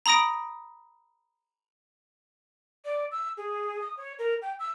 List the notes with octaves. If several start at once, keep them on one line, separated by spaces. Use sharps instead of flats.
A#5 B5 D#6 A#6 D7
D5
E6
G#4
D#6
C#5
A#4
G5
E6